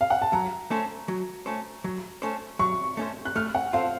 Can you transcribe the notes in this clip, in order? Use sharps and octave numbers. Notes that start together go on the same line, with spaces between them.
F5
F#5
A5
F#3 A#5
A3 C#4 A4 C5
F#3
A3 C#4 A4 C5
F#3
A3 C#4 A4 C5
F#3 C#6
A3 C#4 A4 C5
F#6
A3 F6
F#5
C4 F4 A4 F5